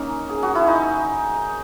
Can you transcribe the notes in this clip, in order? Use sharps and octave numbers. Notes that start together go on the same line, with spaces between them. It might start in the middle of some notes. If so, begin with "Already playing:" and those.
Already playing: A#3 C#4 D#4
G#4
F#4
E4
D#4